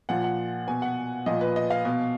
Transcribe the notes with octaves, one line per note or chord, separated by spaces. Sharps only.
A#2 F3 F#5
F#5
B2 G#5
F#5
A#2 F3 D#5
B4
D#5
F5
B2